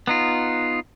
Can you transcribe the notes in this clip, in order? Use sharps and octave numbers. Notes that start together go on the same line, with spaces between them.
B3 D#4 F4